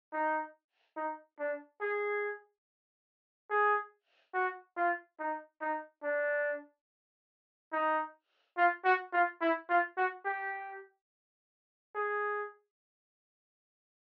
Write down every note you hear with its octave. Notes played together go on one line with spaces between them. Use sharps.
D#4
D#4
D4
G#4
G#4
F#4
F4
D#4
D#4
D4
D#4
F4
F#4
F4
E4
F4
F#4
G4
G#4